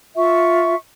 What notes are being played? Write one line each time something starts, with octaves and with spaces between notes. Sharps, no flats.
F4 E5 C#6